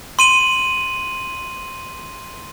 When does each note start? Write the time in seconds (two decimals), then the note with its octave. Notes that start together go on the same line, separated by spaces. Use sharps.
0.19 C6 D#7 F#7